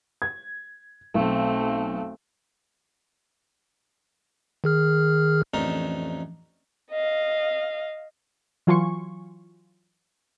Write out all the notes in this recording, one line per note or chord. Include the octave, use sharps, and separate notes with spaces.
G#6
B1 A3 C4
D#3 G#4 F6
A1 F2 A3 D4 D#4 A#4
D#5 F5
E3 F#3 F4 G#5 C6 C#6